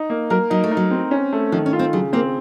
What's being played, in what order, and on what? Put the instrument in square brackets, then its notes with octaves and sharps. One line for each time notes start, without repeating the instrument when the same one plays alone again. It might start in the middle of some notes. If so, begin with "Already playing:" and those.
Already playing: [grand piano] D#4
A#3
[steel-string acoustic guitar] F#3 [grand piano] A#4
[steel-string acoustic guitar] F#3 [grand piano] D#4
[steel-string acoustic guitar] A3
[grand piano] D#4
[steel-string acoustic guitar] F#3
[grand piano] C4
C#4
A3
[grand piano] D#3 [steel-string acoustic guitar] F3
[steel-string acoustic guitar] C#4
[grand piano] F4
[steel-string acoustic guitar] C4
[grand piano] C#3 [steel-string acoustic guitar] F#3
[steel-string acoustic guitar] A#3 [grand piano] C4